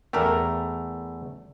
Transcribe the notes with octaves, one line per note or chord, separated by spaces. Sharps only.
E2 A3 G4 A4 A#4